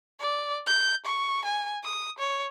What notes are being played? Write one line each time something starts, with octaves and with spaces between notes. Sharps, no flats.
D5
G6
C#6
G#5
D#6
C#5